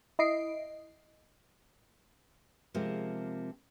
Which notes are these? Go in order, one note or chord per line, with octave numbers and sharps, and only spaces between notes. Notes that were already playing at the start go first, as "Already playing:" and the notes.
E4 D#5 C7 D7
C3 F3 G#3 A#3